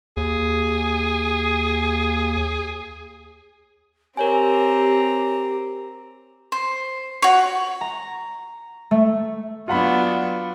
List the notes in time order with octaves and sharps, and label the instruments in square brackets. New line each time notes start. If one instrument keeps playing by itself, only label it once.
[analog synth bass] D#2 [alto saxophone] G#4
[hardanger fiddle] C4 A#5 [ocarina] G4 [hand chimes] A#4 C#5 G#5
[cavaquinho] C5
F#4 C#5
[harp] A#5
A3
[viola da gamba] F#3 B3 D4 [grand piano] F4 F#5 B5